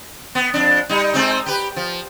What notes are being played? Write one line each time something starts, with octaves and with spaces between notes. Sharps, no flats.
B3
F2 D4
G3 D#4
G#3 C4 D#4
G4 B4
F3